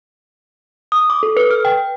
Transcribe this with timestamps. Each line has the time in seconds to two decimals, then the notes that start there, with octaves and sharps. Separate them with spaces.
0.92 D#6
1.10 D6
1.23 A4
1.37 B4
1.51 F6
1.65 G5